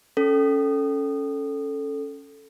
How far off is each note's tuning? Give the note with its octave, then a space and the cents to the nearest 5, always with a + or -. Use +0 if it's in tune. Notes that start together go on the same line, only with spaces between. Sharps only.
C#4 +0 A4 +0